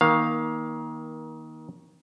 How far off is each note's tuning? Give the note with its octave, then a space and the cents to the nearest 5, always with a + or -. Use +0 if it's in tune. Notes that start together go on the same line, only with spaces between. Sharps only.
D#3 +20 A#3 +25 F5 +0